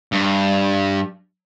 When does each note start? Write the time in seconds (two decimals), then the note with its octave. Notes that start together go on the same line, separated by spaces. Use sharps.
0.12 G2